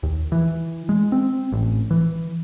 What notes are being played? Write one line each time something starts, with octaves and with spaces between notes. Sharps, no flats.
D#2
E3
G#3
C4
A1
E3